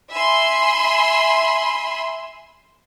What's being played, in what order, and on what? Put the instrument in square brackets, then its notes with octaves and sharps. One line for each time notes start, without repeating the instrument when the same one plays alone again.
[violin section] E5 G#5 B5 C6